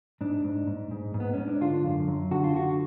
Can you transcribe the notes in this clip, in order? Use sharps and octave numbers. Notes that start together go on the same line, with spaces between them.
G#2 D4
G#2
G#2
G#2
G#2
B3
G#2 C#4
D4
D3 F4
F#2
F#2
D3 F#4
F4
D3 F#4